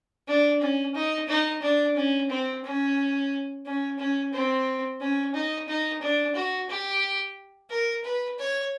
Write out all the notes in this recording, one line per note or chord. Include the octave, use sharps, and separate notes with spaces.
D4
C#4
D#4
D#4
D4
C#4
C4
C#4
C#4
C#4
C4
C#4
D#4
D#4
D4
F#4
G4
A#4
B4
C#5